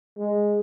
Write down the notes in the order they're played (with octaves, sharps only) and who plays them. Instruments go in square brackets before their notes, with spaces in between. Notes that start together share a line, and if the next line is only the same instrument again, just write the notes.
[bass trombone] G#3